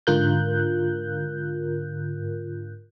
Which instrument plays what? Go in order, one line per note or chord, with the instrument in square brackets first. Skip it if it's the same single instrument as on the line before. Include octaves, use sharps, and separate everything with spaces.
[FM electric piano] G#2 D3 F4 A#4 F#6 G6